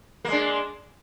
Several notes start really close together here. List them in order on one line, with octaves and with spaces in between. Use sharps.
A#3 G#3 D4